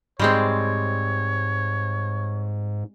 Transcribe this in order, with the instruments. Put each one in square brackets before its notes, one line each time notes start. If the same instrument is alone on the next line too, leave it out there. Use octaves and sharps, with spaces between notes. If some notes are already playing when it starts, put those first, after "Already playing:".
[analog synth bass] G#2 [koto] G3 G#3 C4 [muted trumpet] C#5